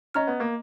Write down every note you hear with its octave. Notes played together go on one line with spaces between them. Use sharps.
C#4 D#5 A#5 F6
B3
A#3